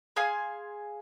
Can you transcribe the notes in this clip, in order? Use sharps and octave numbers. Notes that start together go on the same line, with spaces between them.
G#4 F5 G#5 C6